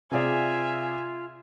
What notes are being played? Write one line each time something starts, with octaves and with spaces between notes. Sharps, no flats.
C3 F4 G#4 D5 E5 G#5